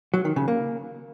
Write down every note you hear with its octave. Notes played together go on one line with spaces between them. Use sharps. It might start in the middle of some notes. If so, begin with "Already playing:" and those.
F#3
D#3
C#3
A#3